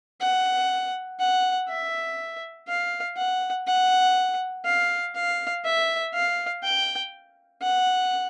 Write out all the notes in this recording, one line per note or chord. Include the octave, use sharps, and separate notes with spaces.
F#5
F#5
E5
F5
F#5
F#5
F5
F5
E5
F5
G5
F#5